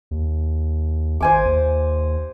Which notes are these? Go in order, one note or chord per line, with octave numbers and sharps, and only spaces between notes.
D#2
G#1 C5 G#5 D6
D#2